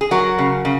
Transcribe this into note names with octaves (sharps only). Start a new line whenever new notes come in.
G#4
F#3 F#4 A#4
C#3
C#3